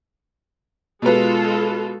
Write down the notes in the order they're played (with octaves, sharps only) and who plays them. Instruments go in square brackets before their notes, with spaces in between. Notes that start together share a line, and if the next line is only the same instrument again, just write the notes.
[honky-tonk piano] B2 B4 [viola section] G#3 F4 A4